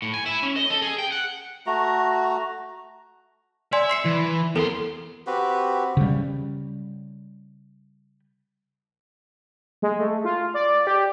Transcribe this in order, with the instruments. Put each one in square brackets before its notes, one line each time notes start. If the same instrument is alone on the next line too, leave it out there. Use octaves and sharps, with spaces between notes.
[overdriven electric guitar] A2
G#5
E4
C#4
D#5
A4
G#4
G5
F#5
[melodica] A3 F#4 A#5
[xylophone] D5 G#5 C6 [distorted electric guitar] E5
[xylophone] C6 C7 C#7
[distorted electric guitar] E3
[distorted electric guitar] E2 C6 [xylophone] A4 A#4
[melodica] C4 F#4 G4 B4
[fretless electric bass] C#3 G3
[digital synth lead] G#3
A3
F4
D5
G4